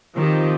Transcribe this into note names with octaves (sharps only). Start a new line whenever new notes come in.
D#3 F3 C4 D#4 G4